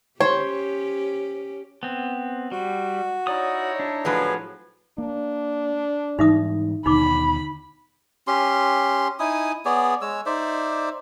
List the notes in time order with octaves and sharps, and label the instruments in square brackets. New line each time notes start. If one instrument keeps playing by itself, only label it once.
[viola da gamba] C#4 G4 [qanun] C5 [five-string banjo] C#5
[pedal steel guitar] B3 C4
[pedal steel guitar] G3 [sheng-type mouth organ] F#4
[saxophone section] D#4 E4 C#5 [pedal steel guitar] D5 D#6
[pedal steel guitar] D4
[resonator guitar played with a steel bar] A2 F3 F#3 [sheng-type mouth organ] G#4 B4
[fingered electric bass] A#3 [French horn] D4
[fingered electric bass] G#2 E3 G3 [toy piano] D#4 E5 D#6
[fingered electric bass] D#2 B2 D3 [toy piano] D#4 D6 [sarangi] B5
[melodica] C#4 G4 C6
D#4 E4 G#5 D#6
B3 G#4 C#5 D5
G#3 C#5 E6
D#4 C5 D5 E5